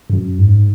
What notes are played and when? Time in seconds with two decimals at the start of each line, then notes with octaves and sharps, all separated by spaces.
0.10 F#2
0.38 G#2